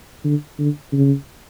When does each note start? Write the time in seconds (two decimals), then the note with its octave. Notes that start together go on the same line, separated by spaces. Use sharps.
0.25 D3
0.59 D3
0.92 C#3